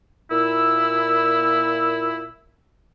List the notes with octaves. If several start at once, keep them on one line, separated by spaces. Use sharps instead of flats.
A#2 E4 E6